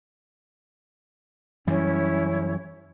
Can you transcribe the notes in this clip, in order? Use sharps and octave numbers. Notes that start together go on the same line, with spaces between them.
F#2 E3 G3 C#4 E4 C#5